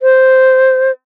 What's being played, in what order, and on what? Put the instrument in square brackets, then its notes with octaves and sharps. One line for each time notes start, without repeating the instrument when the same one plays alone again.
[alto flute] C5